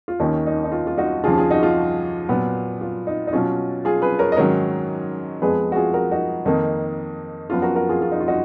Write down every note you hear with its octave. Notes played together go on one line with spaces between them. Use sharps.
F4
D#2 D#3 A#3 C#4 D#4
D#4
D#4
F4
F4
D#4 F#4
D#2 C#3 F3 F4 G#4
F4 G#4
D#4 F#4
F4
A#2 F#3 B3
F4
D#4
D#4
B2 F#3 C#4 F4
F4 G#4
G#4 B4
A#4 C#5
D#5
G#2 D#3 F#3 C#4 A#4 C#5
F2 F3 G#3 B3 G#4 B4
F#4
F4 G#4
F#4 A#4
D#4 F#4
F2 D#3 A#3 D#4
F#2 F3 B3 F4
F#4 A#4
F#4 A#4
F4 G#4
F4
D#4
F4
D#4 F#4